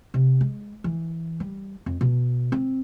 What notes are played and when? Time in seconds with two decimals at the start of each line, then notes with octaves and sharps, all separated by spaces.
0.14 C3
0.41 G#3
0.84 E3
1.40 G3
1.86 F2
2.01 B2
2.52 C4